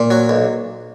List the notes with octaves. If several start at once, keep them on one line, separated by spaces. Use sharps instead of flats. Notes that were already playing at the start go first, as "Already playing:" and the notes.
Already playing: A#2
F#3
B1